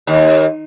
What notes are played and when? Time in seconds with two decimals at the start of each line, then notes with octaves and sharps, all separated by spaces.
0.07 D#2